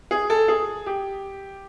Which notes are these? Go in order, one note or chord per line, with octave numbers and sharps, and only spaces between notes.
G#4
A4
G#4
G4